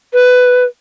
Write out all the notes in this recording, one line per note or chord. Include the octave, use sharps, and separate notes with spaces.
B4